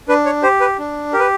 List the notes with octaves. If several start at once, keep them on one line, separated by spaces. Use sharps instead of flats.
D4 B4
C#5
G4 C5
B4
D4
G4 A#4
B4